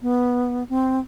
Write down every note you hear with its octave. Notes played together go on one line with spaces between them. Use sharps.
B3
C4